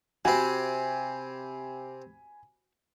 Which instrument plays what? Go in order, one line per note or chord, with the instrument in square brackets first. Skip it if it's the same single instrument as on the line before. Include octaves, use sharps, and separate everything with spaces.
[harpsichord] C3 C4 [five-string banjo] F#4 [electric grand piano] G#5 B5